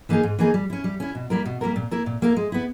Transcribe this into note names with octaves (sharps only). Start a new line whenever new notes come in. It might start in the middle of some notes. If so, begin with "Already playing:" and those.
E3 A#3 D#4 G#4
G#2
E3 A#3 D#4 G#4
G3
C#4 E4
G3
C#4 E4
B2
G3 A#3 E4 A#4
B2
G3 A#3 E4 A#4
A#2
A#3 E4 A#4
A#2
A#3 E4 A#4
G#3
B3 E4